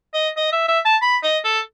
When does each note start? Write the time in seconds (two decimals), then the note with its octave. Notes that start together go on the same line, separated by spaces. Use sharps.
0.14 D#5
0.37 D#5
0.52 E5
0.68 E5
0.85 A5
1.02 B5
1.23 D#5
1.44 A4